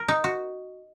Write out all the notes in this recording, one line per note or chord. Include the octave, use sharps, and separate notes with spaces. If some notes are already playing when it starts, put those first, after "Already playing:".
Already playing: A#4
D#4
F#4